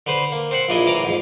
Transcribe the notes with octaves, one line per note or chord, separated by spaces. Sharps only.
D3 B4 C5
A#3
C4 C5 F#5
A#1 A#2 D4 E4 D#5 G#5
A2 E3 A#5 D6
F2 G#2